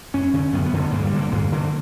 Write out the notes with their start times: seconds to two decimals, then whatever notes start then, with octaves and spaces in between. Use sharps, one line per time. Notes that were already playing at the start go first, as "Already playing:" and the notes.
0.14 F#2 C#4
0.34 D3 C#4
0.53 F#2 B3
0.66 B3
0.74 D3
0.79 B3
0.91 G2 A#3
1.03 G3
1.12 D3 A#3
1.32 G2 A#3
1.52 D3 A#3